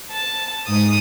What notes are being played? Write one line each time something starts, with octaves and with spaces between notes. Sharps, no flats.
A5
G#2 D#6